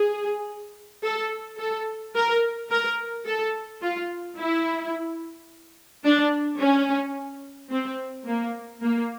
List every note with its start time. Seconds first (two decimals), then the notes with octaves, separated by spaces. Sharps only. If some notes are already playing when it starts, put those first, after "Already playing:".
Already playing: G#4
1.04 A4
1.58 A4
2.15 A#4
2.70 A#4
3.26 A4
3.82 F4
4.37 E4
6.04 D4
6.60 C#4
7.71 C4
8.27 A#3
8.82 A#3